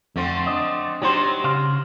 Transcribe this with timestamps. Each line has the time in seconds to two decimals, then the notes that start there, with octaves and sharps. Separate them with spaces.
0.16 F2 D3 A3 C4
0.46 D4 D5 D#5
1.02 F#3 G3 D4 D#4 G4 C5
1.44 C#3 F5 C6